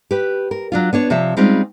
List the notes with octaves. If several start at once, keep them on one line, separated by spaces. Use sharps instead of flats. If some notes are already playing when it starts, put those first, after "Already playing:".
G4 B4
A#4
F#3 D4 F4
B3 D4 C#5
C3 F3 C#5 E5
G3 G#3 C4 C#4 D#4 F4